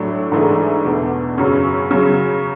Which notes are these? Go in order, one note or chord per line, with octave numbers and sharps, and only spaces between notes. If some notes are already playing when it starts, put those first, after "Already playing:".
Already playing: A2 F#3 A3 D4
G#2 E3 A3 D4 G#4
E2 B2 A3 D4
F#2 C#3 F#3 C#4
C#3 F#3 C#4